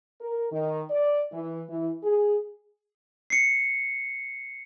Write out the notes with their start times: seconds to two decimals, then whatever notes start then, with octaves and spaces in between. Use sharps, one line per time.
0.21 A#4
0.52 D#3
0.91 D5
1.33 E3
1.70 E3
2.04 G#4
3.30 C7 C#7